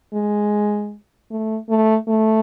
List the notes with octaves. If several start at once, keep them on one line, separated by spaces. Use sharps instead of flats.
G#3
A3
A3
A3